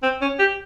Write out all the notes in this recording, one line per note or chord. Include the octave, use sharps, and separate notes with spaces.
C4
C#4
G4